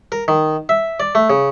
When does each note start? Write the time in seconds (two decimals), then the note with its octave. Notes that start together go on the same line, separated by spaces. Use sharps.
0.12 A#4
0.28 D#3
0.69 E5
1.00 D5
1.15 A3
1.30 C#3